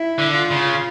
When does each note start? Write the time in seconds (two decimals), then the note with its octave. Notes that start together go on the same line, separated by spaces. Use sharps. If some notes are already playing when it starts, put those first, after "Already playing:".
Already playing: E4
0.18 D3
0.35 F4
0.51 C#3